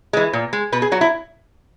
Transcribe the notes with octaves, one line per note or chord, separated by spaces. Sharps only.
E3 G#3
A#2
G#3
B2 B4
G#4
F#3 F#4
E4